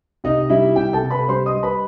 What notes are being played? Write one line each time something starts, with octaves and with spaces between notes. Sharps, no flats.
C3 D#4 D#5
G3 E4 E5
C3 G4 G5
A4 A5
C3
B4 B5
G3 C5 C6
D#5 D#6
G3
B4 B5